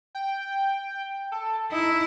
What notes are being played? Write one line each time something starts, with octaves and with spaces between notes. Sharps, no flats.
G5
A4
D#4 E4